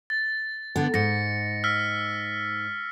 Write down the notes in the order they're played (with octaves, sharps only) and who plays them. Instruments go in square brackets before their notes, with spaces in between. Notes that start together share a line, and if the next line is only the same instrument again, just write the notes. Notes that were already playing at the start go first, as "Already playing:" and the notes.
[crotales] A6
[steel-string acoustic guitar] D3 B3
[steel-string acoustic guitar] G#2 [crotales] A#6 C#7
[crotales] E6 F6 B6